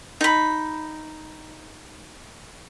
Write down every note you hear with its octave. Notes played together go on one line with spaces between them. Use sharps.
D#4 B5